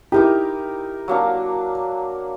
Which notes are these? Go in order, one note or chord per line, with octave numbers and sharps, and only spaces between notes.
D#4 E4 G4 A#4 D6
F#3 A#3 D4